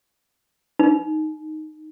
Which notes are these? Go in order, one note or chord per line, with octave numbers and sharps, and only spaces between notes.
D#4